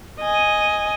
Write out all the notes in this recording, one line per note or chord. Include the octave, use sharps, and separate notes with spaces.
D#5 G#5